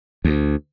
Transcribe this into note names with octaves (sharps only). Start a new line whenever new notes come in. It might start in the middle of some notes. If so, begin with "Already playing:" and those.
D2